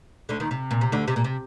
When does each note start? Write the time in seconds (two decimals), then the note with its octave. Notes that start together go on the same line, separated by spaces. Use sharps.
0.29 D2 D3
0.40 D#2 D#3
0.51 C3
0.71 A#2
0.81 C3
0.92 D2 D3
1.08 C3
1.16 A#2
1.24 C3